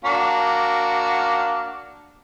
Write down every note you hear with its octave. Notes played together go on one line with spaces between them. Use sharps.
A#3 D4 F#4